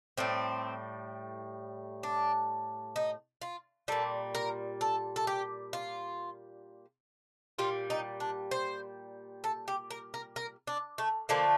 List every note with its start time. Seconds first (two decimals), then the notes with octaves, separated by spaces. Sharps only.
0.17 A2 G3 C4
2.03 D4
2.96 D#4
3.42 F4
3.88 A#2 G3 A4
4.35 A#4
4.81 A4
5.16 A4
5.27 G4
5.73 F4
7.59 A#2 G3 F4
7.90 D#4
8.20 D4
8.51 C5
9.44 A4
9.68 G4
9.91 A#4
10.14 A#4
10.36 A#4
10.67 D4
10.98 A3
11.29 D3 F3 A3 A#3